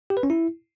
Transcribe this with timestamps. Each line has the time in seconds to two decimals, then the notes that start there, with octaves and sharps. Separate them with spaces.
0.10 G4
0.17 B4
0.23 C#4
0.30 E4